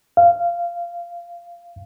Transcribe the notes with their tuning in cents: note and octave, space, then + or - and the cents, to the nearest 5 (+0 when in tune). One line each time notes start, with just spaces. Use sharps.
F5 -15